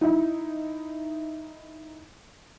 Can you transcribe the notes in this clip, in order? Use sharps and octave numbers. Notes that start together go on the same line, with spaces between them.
D#4 E4